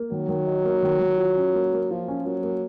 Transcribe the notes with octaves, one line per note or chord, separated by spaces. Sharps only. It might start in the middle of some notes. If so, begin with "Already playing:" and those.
Already playing: A#3
D#3 F#3
D#3
D#4
A#3
D#3
D#3
F4
C#4
A#3
A#3
F3 F4
C#4
F#3 A#3
A#3